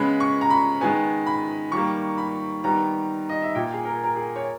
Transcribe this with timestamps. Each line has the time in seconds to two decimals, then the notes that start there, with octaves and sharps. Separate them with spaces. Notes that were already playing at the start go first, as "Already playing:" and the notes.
Already playing: C#3 G#3 B3 B5
0.20 C#6
0.41 A#5
0.50 B5
0.81 D#3 G#3 B3 G#5
1.26 B5
1.72 D#3 G3 A#3 C#6
2.18 B5
2.64 D#3 G3 B3 A#5
3.29 D#5
3.42 E5
3.55 A#2 A#3 G5
3.73 G#4
3.85 A#4
4.03 A#4
4.15 G#4
4.36 C#5